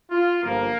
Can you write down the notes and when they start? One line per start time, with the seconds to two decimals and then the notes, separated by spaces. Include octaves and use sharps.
0.11 F4
0.43 G1 G2 F3 A#3